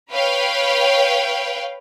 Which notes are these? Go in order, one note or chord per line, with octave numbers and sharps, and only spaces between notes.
B4 C#5 F5 G5